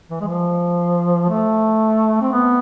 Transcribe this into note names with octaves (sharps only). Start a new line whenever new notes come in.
E3
G#3
F3
A3
C4
B3